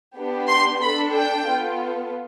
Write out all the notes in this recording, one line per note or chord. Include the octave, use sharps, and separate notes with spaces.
B3 D4 G4
C6
D4 A4 B5
G5
B3 F4 A4